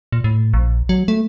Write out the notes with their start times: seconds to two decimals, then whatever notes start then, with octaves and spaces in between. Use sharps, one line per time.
0.12 A#2
0.24 A2
0.54 A#1
0.89 F#3
1.08 A3